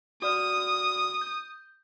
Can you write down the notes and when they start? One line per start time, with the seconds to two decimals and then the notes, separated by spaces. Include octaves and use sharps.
0.22 F#4 D5 D#6 F6
1.21 G6